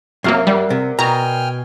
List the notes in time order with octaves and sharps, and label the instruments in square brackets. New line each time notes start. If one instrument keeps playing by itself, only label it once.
[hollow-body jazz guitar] F#2 [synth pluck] C3 F#3 A#3 [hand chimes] E5 F6 C7
[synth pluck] G3 [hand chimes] A#4 D5 F#5
[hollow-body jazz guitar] C3
[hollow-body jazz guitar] B2 [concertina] G5 G#5 F6 [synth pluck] A#5